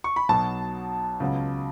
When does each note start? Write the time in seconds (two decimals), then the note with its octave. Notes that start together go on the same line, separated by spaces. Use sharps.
0.04 C#6
0.16 B5
0.29 B1 B2 F#3 A5
1.20 C#2 C#3 F#3 B3